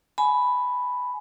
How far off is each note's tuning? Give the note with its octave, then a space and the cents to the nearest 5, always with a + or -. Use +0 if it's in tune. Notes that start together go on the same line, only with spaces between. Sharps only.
G#5 +25 B5 +0